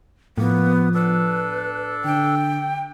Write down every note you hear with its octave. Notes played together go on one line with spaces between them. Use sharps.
A2 F3 A#3 B3
D4 A4 B4
D3 G5